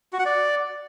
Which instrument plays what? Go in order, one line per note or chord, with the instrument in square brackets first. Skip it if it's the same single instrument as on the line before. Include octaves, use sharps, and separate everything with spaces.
[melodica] F#4
F#5
D5